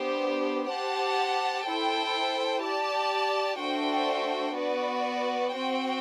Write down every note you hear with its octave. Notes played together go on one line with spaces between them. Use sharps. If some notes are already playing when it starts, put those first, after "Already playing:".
Already playing: B3 D4 G4 C5
G4 C5 F#5 A5
E4 A4 C5 G5
G4 D5 A5
A3 D4 F#4 C5 G5
B3 F#4 B4 D5
C4 F#4 C5 G5